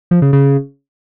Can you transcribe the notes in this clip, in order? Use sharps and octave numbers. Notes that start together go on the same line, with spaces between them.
F3
C#3
C#3